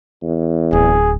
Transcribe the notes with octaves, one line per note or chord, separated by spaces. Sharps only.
E2
D1 G#4